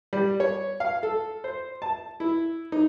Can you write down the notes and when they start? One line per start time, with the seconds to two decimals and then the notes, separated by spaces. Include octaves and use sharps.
0.13 G3
0.40 C#5
0.80 F5
1.03 A4
1.44 C5
1.82 A5
2.20 E4
2.72 D#4